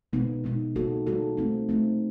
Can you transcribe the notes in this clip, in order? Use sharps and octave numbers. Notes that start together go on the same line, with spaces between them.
B2 G#3 B3 D#4
B2 G#3 B3 D#4
G3 A#3 D#4 F#4 A4
G3 A#3 D#4 F#4 A4
A3 C4 D#4
A3 C4 D#4